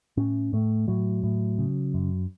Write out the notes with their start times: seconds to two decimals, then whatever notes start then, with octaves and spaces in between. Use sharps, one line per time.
0.17 A2 C#4
0.53 A2 A3
0.88 A2 F#3
1.23 A2
1.59 C#3
1.94 F#2